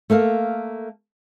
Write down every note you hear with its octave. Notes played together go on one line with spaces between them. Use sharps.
A3 A#3 A4 F5